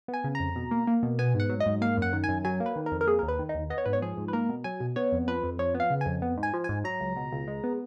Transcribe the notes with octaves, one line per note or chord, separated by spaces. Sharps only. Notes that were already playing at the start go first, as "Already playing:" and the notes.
B3
G#5
C#3
F2 A#5
B2
A#3
A#3
B2
B3 G#5
G#2
F#5
F#3
D#5
G#2
A#3 F5
F#2 F#5
D#3
F#2 G#5
F#3 G#5
A#3
B4
D#3
A#4
F2
A#4
A#3 G#4
D#2 A#4
B4
D#3
D#4
D#2
B3 D#5
C#5
G#2 B4
C#5
F3 G#4
G#2
B4
A#3 A#4
B2
F#3 G#5
B2
B3 C#5
F2
F3 B4
F2
F3 C#5
B3
F5
C#3
G#5
F2
B3
G#2
G#5
F3
G#2 G#5
F#3 A#5
C#2
B2
C#2
G#3
B3